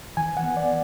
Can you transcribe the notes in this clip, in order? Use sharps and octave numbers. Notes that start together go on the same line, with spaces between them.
E3 G#5
F#5
B3
D5